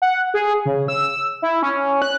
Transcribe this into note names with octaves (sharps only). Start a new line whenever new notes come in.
F#5
G#4
C#3
E6
E4
C#4
F#6